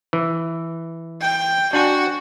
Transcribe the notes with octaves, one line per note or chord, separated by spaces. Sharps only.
E3
G5
D4 F#4 F#5 G#5